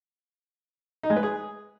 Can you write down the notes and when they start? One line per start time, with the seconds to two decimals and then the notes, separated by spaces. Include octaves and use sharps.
1.03 D#4
1.10 G#3
1.16 B4
1.23 G#4